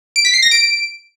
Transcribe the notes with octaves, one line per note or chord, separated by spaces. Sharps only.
D7
B6
C7
A#6
D7